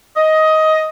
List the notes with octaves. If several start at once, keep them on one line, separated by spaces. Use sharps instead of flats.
D#5